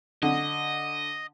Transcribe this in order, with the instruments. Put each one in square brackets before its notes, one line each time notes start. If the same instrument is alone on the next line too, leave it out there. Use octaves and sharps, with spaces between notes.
[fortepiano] D3 [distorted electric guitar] D#5